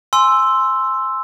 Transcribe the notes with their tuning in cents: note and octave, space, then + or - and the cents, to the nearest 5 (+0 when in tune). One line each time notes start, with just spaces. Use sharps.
G#5 +5 C6 +0 E6 +0